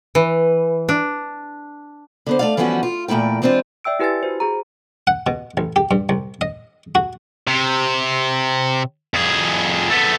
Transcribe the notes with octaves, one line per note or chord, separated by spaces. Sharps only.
E3
D4
D3 B3 C5
A3 D5 F5
E3 F3 G3 B3 C#4 F#4
F4
E2 A#2 A3 E4 G5
E3 G#3 C4 D4 F4
D5 E5 G5 E6 D7
E4 G4 B4 G#5 E6 A6
F#4 C5
F#4 G#4 A#5
F#5
B2
A1
G4
G2
C2
D#5
F#4
C3
F2 G#4
A3 B3